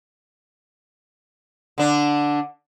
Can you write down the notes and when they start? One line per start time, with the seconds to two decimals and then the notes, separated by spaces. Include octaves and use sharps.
1.78 D3 D4